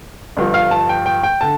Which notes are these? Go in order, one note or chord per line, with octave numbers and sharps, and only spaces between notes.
G1 G2 F3
F5
A5
G5
G5
G5
D3 A5